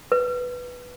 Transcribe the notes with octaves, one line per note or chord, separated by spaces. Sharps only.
B4